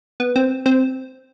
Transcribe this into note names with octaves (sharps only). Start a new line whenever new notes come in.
B3
C4
C4